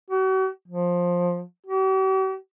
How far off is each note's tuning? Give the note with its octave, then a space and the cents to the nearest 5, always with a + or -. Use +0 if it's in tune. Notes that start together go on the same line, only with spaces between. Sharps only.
F#4 +40
F3 +15
G4 -45